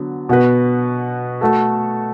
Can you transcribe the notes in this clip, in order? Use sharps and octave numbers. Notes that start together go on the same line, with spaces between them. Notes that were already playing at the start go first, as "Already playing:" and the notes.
Already playing: D3 F#3 B3
B2 B3 F#4 B4
A3 F#4 A4